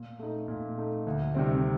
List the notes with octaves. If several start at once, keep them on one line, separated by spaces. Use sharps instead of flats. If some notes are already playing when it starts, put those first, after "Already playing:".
Already playing: A#2
A3 D#4
A#2
A3 D#4
D2
C3 D#3 G3 C4